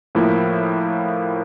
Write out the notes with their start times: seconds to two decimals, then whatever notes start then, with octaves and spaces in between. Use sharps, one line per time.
0.15 A2 F3 A#3 E4